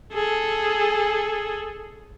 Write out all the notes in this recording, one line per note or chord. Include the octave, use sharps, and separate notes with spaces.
G#4 A4